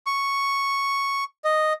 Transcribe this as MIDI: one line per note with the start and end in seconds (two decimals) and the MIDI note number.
0.06 1.24 85
1.44 1.73 75